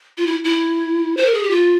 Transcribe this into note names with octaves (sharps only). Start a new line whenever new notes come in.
F4
E4
E4
C5
A#4
G#4
G4
F4